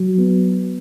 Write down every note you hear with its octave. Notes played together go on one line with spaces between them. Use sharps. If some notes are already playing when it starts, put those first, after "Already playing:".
Already playing: F#3
B3